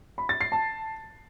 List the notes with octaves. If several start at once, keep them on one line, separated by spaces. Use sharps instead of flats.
B5
A6
C7
A5